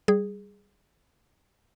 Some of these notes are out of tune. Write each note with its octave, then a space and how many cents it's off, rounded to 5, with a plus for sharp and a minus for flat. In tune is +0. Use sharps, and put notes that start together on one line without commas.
G3 +0 G#4 -5